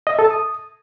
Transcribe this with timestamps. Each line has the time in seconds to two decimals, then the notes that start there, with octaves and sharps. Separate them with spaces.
0.07 D#5
0.13 E5
0.19 A4
0.25 A5
0.30 D#6